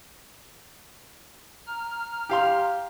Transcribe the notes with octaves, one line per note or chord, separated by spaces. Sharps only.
A#5 F6
G4 F5 C6